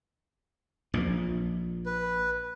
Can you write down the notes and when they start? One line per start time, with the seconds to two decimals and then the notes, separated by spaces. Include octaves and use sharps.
0.94 A#1 A#2
1.86 B4